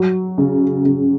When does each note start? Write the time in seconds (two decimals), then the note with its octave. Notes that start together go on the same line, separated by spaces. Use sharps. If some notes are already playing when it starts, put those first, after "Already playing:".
Already playing: F#3
0.38 C#3
0.85 C#3